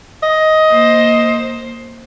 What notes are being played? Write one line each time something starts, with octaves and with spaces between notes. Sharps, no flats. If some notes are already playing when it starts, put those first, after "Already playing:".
D#5
A#3 C5